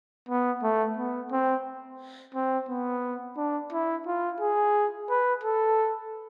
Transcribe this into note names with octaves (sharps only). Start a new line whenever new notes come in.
B3
A3
B3
C4
C4
B3
D4
E4
F4
G#4
B4
A4